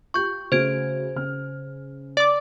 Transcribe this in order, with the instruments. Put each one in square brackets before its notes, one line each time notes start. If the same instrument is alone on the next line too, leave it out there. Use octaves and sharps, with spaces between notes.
[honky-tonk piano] F4 G4 [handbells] C#6 G6
[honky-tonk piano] C#3 A3 F#4 [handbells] C5 G#6 D7
[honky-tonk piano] C#3 F6
[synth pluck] D5 D6